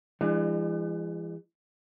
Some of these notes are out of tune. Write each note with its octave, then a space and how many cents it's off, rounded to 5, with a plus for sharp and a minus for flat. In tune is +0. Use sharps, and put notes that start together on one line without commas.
E3 +35 G#3 -30 D4 +40